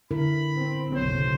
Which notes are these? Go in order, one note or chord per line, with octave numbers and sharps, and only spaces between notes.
D3 E4 A#4 B5
C4
F#1 B1 C5 C#5